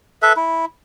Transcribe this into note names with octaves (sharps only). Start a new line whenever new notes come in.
A4 B4 E5
E4